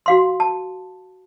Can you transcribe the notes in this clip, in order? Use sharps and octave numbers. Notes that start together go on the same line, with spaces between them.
F#4 F5 C6
A5